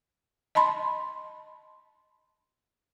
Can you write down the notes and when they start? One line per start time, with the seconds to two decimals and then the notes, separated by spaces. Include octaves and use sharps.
0.55 D#5 A5 B5 C6